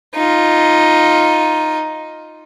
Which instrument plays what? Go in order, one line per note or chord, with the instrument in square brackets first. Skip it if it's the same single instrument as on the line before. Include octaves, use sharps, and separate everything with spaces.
[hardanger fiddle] D#4 F4